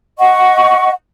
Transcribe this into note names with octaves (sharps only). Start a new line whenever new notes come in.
D#5 F#5 C#6